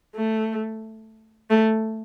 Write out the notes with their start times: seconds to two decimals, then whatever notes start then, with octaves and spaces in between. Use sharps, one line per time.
0.15 A3
1.50 A3